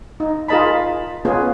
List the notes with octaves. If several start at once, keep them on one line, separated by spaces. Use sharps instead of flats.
D#4
F4 G#4 A#4 D#5 A5 B5
B3 C#4 F4 G#4